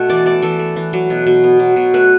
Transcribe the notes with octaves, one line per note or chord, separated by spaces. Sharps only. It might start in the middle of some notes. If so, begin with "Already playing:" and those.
Already playing: B2 A3 B3
E3 D5
A3 D5
E3 A4
A3
E3
F#3
B2
B2
B3
F#3
B2
A3 B4